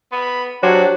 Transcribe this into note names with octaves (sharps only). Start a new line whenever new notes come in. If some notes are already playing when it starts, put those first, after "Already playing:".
B3 B5
F#3 D4 F#4 G4 C5 C#5